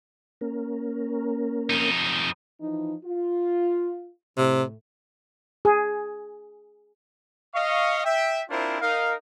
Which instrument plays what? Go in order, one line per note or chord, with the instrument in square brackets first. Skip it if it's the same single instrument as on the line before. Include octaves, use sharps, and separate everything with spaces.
[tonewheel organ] A#3 C#4 A#4
[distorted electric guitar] F2 D#4
[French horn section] E3 F3 D#4
F4
[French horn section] A2 [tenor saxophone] C3
[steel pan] G#4
[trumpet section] D#5 F5 C#6
E5 G5
C4 D4 E4 F4 A#4 C5
D#4 A#4 F5